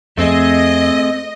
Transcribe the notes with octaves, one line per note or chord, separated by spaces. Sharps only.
F2 A3 C4 G#4 D#5